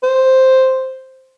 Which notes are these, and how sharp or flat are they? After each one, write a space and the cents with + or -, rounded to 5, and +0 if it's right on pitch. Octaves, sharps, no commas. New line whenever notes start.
C5 +0